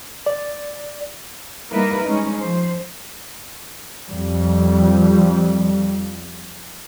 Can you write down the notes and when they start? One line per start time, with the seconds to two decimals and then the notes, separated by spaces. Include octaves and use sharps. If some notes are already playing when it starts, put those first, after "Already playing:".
0.26 D5
1.72 G3 A#3 D#4 E4 A#4 B4
2.04 G#3 C#4 D#4
2.36 F3 C5
4.08 F2 G3